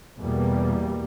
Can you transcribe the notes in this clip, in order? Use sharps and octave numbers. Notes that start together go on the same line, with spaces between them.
E2 B2 G3 A#3